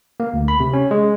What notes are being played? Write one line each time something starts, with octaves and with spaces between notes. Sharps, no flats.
A#3
D2
B5
C3
C#4
G#3